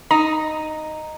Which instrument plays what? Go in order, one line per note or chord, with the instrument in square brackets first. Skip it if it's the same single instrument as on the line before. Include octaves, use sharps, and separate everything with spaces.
[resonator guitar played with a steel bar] D#4 [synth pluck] A#5